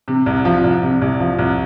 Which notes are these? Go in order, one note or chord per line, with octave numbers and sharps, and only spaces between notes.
C3
C2
F3
C2
C3
C2
F3
C2